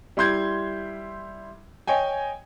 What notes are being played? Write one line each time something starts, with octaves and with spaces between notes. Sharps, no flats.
G3 E4 C6 G6 G#6
C#5 D#5 G5 G#5